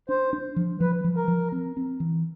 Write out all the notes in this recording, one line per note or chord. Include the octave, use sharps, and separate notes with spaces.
D4 C5
D4
F3
F3 B4
F3
A#4
F3
C4
C4
E3